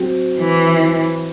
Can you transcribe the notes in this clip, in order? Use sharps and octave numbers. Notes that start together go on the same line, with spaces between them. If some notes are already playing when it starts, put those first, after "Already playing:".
Already playing: F#3 C4
E3